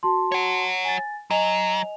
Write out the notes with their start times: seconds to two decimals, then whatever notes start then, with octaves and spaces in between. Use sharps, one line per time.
0.03 F#4 A5 C6
0.32 C#5 F#5
0.85 G#5 A6
1.31 F#3 D#5 G#5 F7